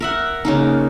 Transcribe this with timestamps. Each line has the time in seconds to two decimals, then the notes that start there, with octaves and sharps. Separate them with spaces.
0.01 A#4 E5 F#5
0.45 C#3 A#3 D#4